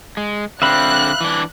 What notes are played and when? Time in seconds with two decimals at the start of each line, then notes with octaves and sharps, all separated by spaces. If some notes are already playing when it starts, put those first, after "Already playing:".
0.17 G#3
0.62 D3 C4 E5 F5 B5 F#6
1.21 E3 D4